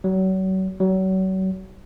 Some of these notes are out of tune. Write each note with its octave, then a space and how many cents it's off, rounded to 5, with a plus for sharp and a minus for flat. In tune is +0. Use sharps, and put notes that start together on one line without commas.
F#3 +35
F#3 +35